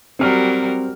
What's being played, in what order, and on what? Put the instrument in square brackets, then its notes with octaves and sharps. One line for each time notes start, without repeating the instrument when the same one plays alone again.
[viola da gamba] F#3 G3 A#4 [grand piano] C4 F6